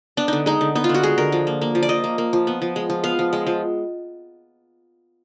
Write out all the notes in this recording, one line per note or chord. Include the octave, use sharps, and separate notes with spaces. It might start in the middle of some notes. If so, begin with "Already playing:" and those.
B3 D4
D3 D#4
G#3 D#4
D3
B3 D#4
F4
D3
F#4
G#3 G#4
D3 A#4
F3
A#3
A#3
F3
D5
F3 D#5
A#3
A#3
F3
B3
F3
G#3
F3
B3 F5
F3
G#3
F3